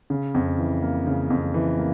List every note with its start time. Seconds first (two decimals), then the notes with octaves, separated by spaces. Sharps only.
0.10 C#3
0.34 F2
0.58 E3
0.82 A#3
1.07 C#3
1.30 F2
1.54 E3
1.79 A#3